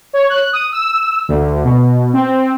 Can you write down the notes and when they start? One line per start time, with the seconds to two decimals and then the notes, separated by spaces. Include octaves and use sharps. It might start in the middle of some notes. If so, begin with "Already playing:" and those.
0.13 C#5
0.30 F#6
0.53 D#6
0.72 E6
1.28 D2
1.64 B2
2.13 C4